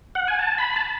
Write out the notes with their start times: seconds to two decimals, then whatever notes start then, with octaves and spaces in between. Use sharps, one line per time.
0.15 F#5
0.28 G#5
0.39 A5
0.58 B5
0.76 A5